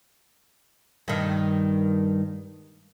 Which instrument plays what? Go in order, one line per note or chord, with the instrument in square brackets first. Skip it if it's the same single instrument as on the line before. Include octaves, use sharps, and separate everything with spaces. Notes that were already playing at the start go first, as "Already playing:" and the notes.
[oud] G2 D#3